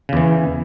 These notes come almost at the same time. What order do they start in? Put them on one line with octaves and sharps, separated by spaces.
C#3 E2 E3